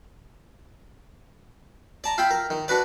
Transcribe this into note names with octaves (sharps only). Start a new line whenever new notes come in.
D5 A5 A#5
F4 E5 G5 B5
A#4
D#3
D4 F#4 B4 D5